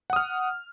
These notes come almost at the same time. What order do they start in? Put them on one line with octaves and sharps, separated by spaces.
F#5 D#6 F6